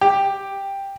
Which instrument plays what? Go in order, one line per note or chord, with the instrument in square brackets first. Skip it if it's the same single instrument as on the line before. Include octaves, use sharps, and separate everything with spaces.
[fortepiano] G4